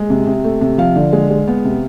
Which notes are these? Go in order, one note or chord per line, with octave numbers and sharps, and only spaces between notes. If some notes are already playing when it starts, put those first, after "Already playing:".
Already playing: G#3
C3
C3
A3
C3
F3 F5
D3
G#3
G#3
B3
C3